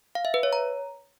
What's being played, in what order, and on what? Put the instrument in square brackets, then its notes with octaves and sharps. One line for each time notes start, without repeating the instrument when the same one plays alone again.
[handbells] F5
E5
B4
C#5
A#5